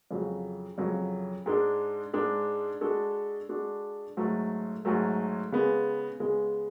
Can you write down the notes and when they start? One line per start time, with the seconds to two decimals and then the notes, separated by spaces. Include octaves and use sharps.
0.11 F2 C#3 F#3
0.78 F2 C#3 F#3
1.46 G#2 G#3 D4
2.13 G#2 G#3 D4
2.81 G#3 D4 F#4 A4
3.49 G#3 D4 F#4 A4
4.17 G#2 F#3 A3
4.85 G#2 F#3 A3
5.52 C#3 G#3 B3
6.20 C#3 G#3 B3